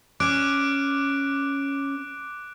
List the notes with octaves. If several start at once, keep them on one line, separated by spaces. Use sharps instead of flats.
C#4 D6 F#6 D7